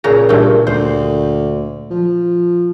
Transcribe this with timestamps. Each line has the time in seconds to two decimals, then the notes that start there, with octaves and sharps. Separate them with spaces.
0.04 A#2 C#3 A#5
0.29 G2 A#2 A3 C4
0.67 D2 C5
1.91 F3